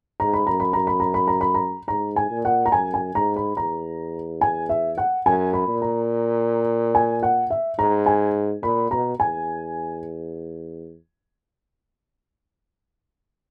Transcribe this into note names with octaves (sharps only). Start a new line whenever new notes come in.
G#2 A#5
B5
F#2 A#5
B5
F#2 A#5
B5
A#5
B5
A#5
B5
A#5
G#2 A#5
G#5
A#2
F#5
A#5
F#2 G#5
G#5
G#2 A#5
B5
E2 A#5
G#5
E5
F#5
F#2 G#5
B5
A#2
A#5
G#5
F#5
E5
G#2 A#5
G#5
A#2 B5
B2 A#5
E2 G#5